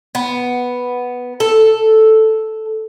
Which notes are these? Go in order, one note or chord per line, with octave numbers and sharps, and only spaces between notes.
B3
A4